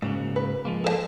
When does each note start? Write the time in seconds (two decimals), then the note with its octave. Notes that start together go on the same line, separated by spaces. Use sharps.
0.02 G#2 C#3 A#3 F#4
0.36 B4
0.65 F3 G#3 A#3
0.84 A4 A#4 A5